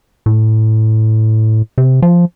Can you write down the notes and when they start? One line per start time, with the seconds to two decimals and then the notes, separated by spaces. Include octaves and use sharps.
0.26 A2
1.78 C3
2.02 F3